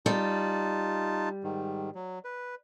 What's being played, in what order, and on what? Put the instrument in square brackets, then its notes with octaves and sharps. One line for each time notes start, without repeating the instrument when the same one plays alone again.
[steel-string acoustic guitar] G3 [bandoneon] D#4 F4 A5
[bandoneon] G#2 D#3
F#3
B4